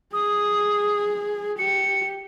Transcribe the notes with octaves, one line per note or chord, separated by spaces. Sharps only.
G#4 D#6
G4 C#7